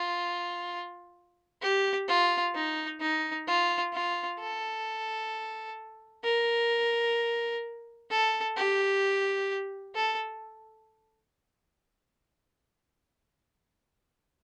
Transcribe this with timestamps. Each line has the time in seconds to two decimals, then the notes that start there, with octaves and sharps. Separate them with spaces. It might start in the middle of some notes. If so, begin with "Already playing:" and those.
Already playing: F4
1.62 G4
2.08 F4
2.55 D#4
3.01 D#4
3.47 F4
3.93 F4
4.40 A4
6.25 A#4
8.10 A4
8.57 G4
9.95 A4